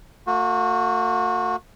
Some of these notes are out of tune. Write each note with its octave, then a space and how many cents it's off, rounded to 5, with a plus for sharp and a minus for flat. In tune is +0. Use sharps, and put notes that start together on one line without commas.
A3 +45 F#4 -30